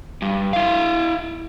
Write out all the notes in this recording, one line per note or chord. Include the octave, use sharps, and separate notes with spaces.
G2
E4 F5